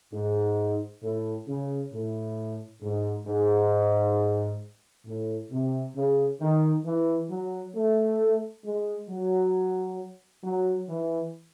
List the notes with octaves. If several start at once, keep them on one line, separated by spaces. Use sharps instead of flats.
G#2
A2
C#3
A2
G#2
G#2
A2
C3
C#3
D#3
E3
F#3
A3
G#3
F#3
F#3
E3